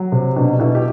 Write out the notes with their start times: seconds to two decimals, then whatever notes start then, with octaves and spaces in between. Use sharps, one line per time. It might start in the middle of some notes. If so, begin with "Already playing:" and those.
Already playing: F#3
0.12 C3
0.36 B2 D4
0.59 B2 E4
0.75 G4